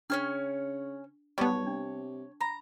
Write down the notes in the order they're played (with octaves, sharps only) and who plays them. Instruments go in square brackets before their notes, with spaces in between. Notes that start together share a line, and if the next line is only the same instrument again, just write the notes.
[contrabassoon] C#3 [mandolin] C#4 C#5 F6 [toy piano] D4
[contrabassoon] B1 [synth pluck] G3 B3 [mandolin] C#5 [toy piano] A5 C#6
[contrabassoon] C3 [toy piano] D4
[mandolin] A#5 [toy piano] B5